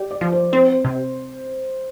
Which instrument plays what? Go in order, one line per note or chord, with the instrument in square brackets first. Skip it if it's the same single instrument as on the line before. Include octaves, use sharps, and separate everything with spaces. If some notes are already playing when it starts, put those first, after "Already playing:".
Already playing: [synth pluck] G4 [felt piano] D5
[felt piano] D5
[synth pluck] F3
[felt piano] C5
[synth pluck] C4 [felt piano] C5
[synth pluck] C3